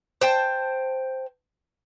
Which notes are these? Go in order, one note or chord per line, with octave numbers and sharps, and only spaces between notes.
C5 G5 A5